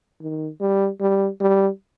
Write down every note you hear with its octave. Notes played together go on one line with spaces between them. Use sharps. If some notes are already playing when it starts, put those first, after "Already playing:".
D#3
G3
G3
G3